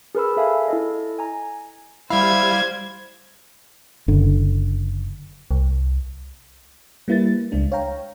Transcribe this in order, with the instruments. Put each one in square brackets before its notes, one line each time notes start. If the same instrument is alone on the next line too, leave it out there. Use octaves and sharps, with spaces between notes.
[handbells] G#4 A#4 B4 B5 E6
A4 E5 F5 G#5
E4 A4 D#5
G#5 A#5
[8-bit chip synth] G3 F5 [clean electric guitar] E4 [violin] C5 G#6
[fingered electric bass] F#1 D3
[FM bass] C2
[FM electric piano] G3 A#3 E4 B4 A6
C#2 G#3 D4
C#5 F5 G5 A#5